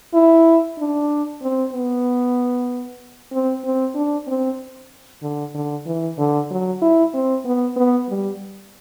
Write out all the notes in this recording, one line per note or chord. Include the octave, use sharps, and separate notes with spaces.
E4
D4
C4
B3
C4
C4
D4
C4
D3
D3
E3
D3
F#3
E4
C4
B3
B3
G3